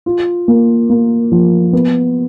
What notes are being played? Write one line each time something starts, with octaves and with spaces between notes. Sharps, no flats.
F4
A#3
A#3
F3
B3